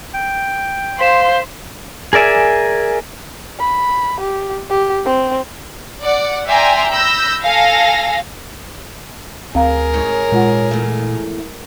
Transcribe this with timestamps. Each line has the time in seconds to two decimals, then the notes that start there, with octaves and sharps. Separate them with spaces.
0.14 G5
0.99 C5 F5 C6 B6 E7
2.13 G#4 A#4 D5 E5 G#5
3.60 B5
4.20 G4
4.70 G4
5.06 C4
6.02 D5 F#5
6.46 D5 E5 G5 G#5 A#5 C6
6.91 B5 E6 G6 A#6
7.44 A4 F5 G#5 A#6
9.55 D2 C4 G#4 A#4 F5 A#5
9.94 G#2 C#5
10.32 A#2 G#3 F4 F#5
10.71 E2 A3